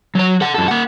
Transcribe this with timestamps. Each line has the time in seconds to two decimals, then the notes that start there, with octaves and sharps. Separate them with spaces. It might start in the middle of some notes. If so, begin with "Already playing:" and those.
0.15 F#3 C#5
0.41 A4 F#5
0.55 F#2 A4
0.68 A#3 F#5